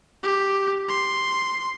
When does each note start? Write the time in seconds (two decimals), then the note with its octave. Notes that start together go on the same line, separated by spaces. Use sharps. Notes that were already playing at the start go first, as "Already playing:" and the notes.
0.23 G4
0.88 C6